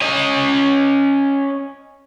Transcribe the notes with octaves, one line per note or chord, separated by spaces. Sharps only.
C#4 D#5